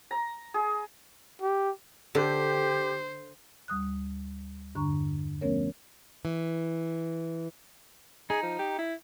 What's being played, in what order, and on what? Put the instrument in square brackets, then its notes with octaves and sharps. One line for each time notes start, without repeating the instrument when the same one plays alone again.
[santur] A#5
G#4
[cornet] G4
[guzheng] D3 [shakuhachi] G4 [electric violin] C5
[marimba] D2 G3 D#6 F#6
E2 G2 D3 D4 A#5 C#6
F3 A3 B3 C#4 A#4 C#5
[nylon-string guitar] E3
[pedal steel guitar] D#4 [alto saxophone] G#4
[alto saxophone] F3
G4
E4